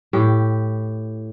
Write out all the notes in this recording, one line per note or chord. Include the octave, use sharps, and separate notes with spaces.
A2 G4